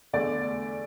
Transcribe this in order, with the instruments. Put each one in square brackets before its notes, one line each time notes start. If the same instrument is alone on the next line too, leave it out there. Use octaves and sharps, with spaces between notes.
[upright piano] E2 D3 A3 D5